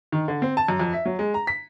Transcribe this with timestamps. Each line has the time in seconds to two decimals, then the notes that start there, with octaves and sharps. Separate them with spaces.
0.12 D#3
0.28 D3
0.42 C4
0.57 A5
0.68 F#2
0.80 F2
0.93 E5
1.05 F#3
1.19 G#3
1.34 A#5
1.47 B6